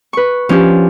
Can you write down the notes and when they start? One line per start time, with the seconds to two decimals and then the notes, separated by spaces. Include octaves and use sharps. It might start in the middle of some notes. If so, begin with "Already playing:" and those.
0.13 B4 C#6
0.49 F3 C#4 D4 G4